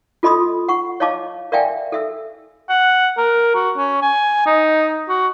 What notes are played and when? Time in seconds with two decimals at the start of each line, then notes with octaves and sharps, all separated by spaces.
0.23 F4 A4 D#5 B5 C6 D#6
0.68 F#5 C#6
1.00 C#5 D#5 F5 A5 D6
1.52 A#4 D5 E5 F5 G5 G#5
1.92 A4 E5 E6
2.69 F#5
3.17 A#4
3.55 F#4
3.77 C#4
4.02 G#5
4.46 D#4
5.09 F#4